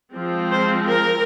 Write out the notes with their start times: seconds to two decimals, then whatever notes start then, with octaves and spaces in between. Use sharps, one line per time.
0.13 F3 G#3 C4
0.51 C5
0.89 A#4